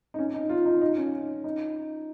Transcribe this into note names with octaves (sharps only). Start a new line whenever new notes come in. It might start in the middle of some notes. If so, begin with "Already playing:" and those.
D#4
C#4
D#4
F4
D#4
D#4
C#4
D#4